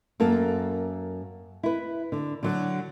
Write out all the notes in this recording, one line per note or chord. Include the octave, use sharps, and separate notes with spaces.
F#2 A#3 A4
E4 B4
D3
D3 F#3 F#4